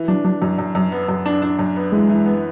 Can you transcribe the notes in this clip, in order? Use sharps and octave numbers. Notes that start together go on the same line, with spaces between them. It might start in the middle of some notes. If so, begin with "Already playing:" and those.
Already playing: E3
F#3 D4
F#3 D4
F#2 F#3
F#2
F#2
B3
F#2
D4
D4
F#2
B3
E3 G#3
E3
B3